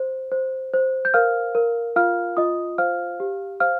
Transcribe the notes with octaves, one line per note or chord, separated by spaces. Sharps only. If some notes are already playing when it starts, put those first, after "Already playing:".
Already playing: C5
C5
C5
G6
A#4 F5 F6
A#4
F4 F5 F6
F4 D#5 D#6
C5 F5 F6
G4
C5 F5 F6